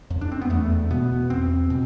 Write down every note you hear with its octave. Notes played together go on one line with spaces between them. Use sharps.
F2
D4
C4
B3
E2 A3
B2 B3
E2 C4
B2